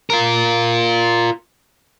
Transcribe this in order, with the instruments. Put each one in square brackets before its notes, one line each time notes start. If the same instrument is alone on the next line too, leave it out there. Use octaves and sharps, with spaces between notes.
[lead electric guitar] F4 A#4